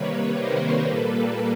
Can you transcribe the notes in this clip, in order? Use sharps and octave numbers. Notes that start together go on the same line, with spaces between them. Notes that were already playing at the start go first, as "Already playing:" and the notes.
Already playing: C3 D#3 G3 A#3 B4 C#5
A#4 C5
A#2 G3 A#3 A4 B4